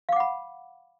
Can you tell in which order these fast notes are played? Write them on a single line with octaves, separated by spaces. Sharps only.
F5 D6 F#5 B5